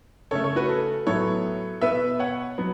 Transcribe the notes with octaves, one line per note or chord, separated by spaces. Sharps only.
C#3 A3 A4 C#5
A4 C#5
F#4 B4
A4
A2 F#3 B3 A4 C#5
B2 B3 B4 E5
C#5 F#5
F#3 B3